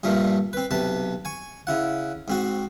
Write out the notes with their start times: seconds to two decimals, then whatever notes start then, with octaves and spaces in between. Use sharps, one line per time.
0.03 G2 A#2 F3 A3
0.53 C4 B4
0.71 B1 C3 B4 A5
1.25 G#5 C#6
1.67 C#3 E4 F#5
2.28 G#2 C4 F#4